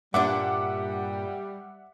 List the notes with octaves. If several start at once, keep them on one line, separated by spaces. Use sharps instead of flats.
G2 A#2 G3 D4 E5 F#5 D6